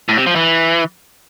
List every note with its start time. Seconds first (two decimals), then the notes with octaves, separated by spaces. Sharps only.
0.09 A2
0.18 C3
0.27 F3
0.35 E3